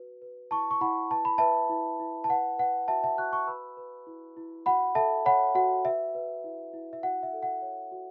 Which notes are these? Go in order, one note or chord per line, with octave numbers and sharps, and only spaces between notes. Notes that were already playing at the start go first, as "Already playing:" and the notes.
Already playing: F#4 B4
B4
E4 A5 C#6
C#6
E4 F#5 B5
B4 A5
B5
B4 E5 A5
E4
E4
A5
B4 F#5
B4 F#5
F#4 E5 A5
E5 A5
F#4 C#6 F#6
A5 C#6
B4 B5 E6
B4
E4
E4
F#4 F#5 B5
A4 E5 A5
C#5 F#5 B5
F#4 F#5
B4 E5
B4
E4
E4
E5
F#4 F#5
E5
A4
F#5
C#5
F#4